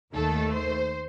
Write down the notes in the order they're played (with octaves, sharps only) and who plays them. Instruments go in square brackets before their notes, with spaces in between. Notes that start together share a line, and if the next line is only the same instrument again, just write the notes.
[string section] D#2 D#3 A3 A4
C5